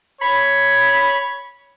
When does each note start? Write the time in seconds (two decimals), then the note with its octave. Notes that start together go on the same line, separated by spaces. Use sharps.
0.21 C#5 B5